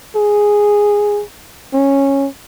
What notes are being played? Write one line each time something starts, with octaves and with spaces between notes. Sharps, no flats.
G#4
C#4